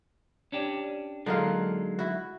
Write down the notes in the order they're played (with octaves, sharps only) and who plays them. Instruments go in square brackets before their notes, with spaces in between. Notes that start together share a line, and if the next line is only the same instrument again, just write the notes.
[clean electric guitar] C#4 D4 G4
[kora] D3 D#4 F4 [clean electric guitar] F#3 G#3 A#3
[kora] E4 F#4